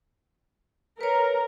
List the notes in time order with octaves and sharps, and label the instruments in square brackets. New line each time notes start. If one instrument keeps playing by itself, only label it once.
[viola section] A#4 [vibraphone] B4 C#5